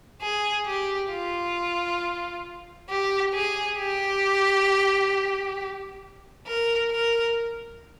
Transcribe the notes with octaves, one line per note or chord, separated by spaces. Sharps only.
G#4
G4
F4
G4
G#4
G4
A#4
A#4